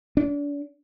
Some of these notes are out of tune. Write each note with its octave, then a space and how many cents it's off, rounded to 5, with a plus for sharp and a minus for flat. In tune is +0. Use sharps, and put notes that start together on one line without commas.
D4 -35